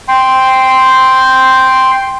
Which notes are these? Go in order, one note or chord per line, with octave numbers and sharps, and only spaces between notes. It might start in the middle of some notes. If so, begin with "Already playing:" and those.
G5 C6